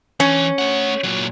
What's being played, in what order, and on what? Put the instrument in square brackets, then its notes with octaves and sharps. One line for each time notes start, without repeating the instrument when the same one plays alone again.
[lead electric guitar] E3 [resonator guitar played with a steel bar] C#4
[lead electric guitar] A3 F#5
A#2 F#3